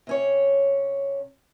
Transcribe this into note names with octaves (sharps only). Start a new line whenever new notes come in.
C3 C#4 C#5